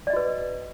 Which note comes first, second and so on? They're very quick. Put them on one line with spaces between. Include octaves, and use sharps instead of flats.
D5 D#5 F#4 B4